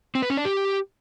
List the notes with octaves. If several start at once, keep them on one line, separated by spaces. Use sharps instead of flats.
C4
B4
C#4
D4
G4